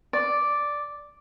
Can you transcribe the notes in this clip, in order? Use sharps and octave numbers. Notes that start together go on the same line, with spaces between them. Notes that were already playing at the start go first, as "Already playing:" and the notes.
D5